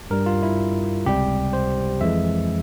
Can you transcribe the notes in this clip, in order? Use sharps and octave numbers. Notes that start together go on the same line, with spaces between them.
G2 G3 A#4
F4
E4
C#2 C3 G3 G4
C5
F2 E3 G#3 E5